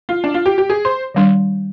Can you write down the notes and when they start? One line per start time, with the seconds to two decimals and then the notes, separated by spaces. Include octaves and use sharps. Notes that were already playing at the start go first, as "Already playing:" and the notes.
0.09 F4
0.24 D4
0.34 F4
0.46 G4
0.58 G4
0.70 G#4
0.85 C5
1.15 D#3 G3 D4